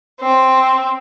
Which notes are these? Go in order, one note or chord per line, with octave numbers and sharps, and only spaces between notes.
C4